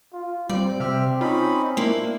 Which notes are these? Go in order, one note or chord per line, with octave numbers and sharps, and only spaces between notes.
F4
G3 C4 D5
C3 G4 E5 F6
C#4 D#4 F4 B5
A#3 D4 E4